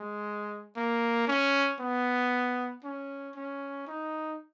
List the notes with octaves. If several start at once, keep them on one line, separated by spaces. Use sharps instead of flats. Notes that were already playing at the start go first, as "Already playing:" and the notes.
Already playing: G#3
A#3
C#4
B3
C#4
C#4
D#4